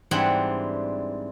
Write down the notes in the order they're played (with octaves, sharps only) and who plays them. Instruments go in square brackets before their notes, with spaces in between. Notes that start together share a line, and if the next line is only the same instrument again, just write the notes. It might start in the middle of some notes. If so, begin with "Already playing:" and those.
[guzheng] G#2 E3 G3 C4 D4 F#5